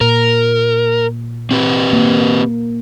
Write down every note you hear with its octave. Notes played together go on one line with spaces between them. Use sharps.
A#2 A#4
C4 G4 B4
A#3